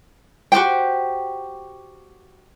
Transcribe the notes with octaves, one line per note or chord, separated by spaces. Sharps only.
F#4 G4 C5 G5